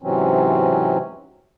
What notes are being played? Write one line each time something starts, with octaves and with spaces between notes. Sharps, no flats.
G#2 C3 E3 F#3 C4 C#4